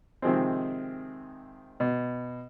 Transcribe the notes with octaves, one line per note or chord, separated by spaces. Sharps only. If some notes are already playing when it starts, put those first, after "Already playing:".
C3 D#3 F3 G#3 C4
B2